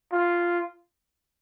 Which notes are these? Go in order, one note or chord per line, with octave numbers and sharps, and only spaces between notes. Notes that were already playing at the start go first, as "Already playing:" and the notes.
F4